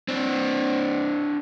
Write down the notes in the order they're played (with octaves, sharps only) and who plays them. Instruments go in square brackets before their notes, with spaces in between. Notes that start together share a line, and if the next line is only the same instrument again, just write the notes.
[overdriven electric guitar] C4 D4